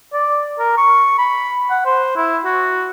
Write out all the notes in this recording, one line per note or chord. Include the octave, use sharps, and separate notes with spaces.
D5
A#4
C#6
B5
F#5
C5
E4
F#4